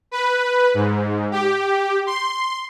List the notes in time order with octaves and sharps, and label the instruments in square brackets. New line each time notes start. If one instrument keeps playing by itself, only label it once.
[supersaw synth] B4
G#2
G4
C6